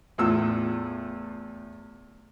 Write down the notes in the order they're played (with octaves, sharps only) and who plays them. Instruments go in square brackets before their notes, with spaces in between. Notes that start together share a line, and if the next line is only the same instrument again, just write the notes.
[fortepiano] E2 A2 F4 E6